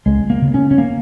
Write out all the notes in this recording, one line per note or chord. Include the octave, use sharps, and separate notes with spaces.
C#2 G#3
A#3
C#3
C#4
C#4
A#3